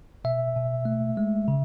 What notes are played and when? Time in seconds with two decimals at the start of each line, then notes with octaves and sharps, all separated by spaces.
0.24 B2 E5
0.56 B2
0.85 A3
1.17 G#3
1.48 C#3